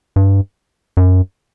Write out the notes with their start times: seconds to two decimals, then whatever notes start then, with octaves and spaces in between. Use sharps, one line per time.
0.16 G2
0.97 F#2